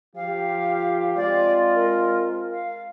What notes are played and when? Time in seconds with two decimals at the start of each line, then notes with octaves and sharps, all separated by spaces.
0.16 F3 F4 G4 F5
1.16 G#3 C4 F4 D5
1.75 A#4
2.52 F5